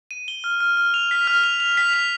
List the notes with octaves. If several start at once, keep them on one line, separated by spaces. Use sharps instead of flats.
D#7
G7
F6
F6
F6
F7
B6
F6
F7
F7
B6
F7